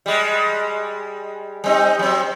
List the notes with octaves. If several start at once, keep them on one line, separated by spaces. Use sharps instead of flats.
G3 G#3
G3 C4 D#4
F#3 C4